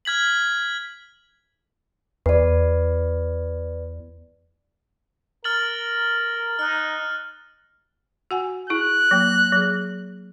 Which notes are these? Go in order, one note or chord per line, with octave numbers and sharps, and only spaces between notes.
F6 G#6 B6 F#7
E2 B4 D5
A#4 F6 A6 F#7
D#4 F6 F#6
F#4 F#5 G#5
E4 G#4 F#6
F#3 A#3
F#3 G#4